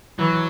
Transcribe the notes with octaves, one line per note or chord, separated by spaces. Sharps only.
E3 F#3